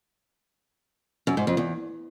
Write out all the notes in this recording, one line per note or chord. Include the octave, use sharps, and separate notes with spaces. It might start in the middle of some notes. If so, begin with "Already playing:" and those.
F#2
G#2
F2
E2